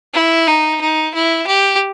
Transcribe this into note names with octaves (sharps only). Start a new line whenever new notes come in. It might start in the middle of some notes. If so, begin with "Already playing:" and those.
E4
D#4
D#4
E4
G4